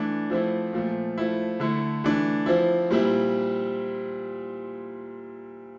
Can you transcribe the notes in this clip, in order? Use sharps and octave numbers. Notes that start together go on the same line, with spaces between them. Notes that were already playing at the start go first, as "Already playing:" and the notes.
Already playing: E3 A3 D4
F3 A3 C4 E4
A#2 F3 A3
F3 A3 E4
D3 A3 E4
E3 A3 D4
F3 C4 E4
A#2 G3 C4 E4